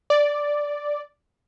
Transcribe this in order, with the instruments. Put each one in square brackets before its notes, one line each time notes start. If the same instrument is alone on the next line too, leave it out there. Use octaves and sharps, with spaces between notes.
[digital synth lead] D5